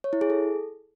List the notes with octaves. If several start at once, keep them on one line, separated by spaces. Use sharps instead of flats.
C#5
E4
G#4
A4